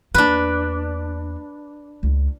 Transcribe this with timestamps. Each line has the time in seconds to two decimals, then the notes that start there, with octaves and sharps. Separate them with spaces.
0.14 E2 A#3 D4 B4
2.03 C#2